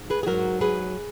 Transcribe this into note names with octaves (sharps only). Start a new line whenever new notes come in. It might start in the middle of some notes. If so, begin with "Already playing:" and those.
Already playing: G#2
G#4 B4
G#4
G#2 F#3 F#4 A#4
G#4 B4